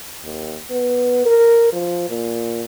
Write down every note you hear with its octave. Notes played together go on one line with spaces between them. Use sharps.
D#2
B3
A#4
F3
A#2